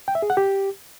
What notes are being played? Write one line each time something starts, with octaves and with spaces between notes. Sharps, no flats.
G5
E5
G#4
F#5
G4